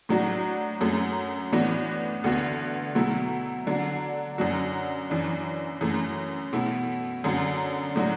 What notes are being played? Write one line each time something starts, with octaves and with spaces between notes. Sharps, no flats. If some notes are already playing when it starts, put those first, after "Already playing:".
A2 F#3 D4 F#4
F#2 F#3 A3
A2 E3 B3 D4 F#4
D2 D3 B3 F#4
B2 F#3 A3 E4
D3 F#3 D4
F#2 F#3 D4 F#4
F#2 E3 D4
F#2 E3 A3
B2 A3 E4
F#2 D3 F#3
A2 F#3 D4 F#4